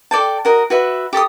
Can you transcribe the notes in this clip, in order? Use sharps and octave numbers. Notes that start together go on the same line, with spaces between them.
A4 D5 G5 A5
F#4 A#4 D#5
F#4 B4 E5
G4 A4 D6 D#6